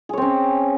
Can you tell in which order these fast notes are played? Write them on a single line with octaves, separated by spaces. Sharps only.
G#4 C#5 C4 C#4